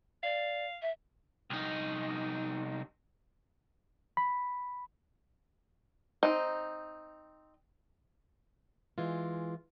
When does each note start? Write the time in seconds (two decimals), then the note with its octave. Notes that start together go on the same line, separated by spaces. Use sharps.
0.23 D5 F5
0.82 E5
1.50 C2 D#4
4.17 B5
6.23 C4 D#4
8.98 E3 G#3 F4